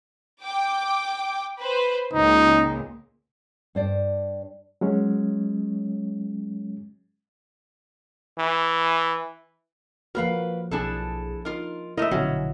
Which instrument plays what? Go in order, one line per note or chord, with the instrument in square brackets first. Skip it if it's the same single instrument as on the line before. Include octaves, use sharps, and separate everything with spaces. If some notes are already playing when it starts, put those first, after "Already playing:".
[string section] G5 D6
B4 C5
[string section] C#2 A#2 [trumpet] D#4
[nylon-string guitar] G2 C5 D5
[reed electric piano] F#3 G#3 C#4
[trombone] E3
[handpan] F3 A#3 F#4 [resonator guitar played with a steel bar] A#4 B4 F5
[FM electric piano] B1 G#4 [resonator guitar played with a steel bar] D4 E4 A4
[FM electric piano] D#4 [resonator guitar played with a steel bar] F4 A#4
[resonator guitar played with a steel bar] A3 A#4 [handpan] E4 [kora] D#5 E5
[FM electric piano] A#1 B2 D3 [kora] F#3 [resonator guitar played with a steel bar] C#4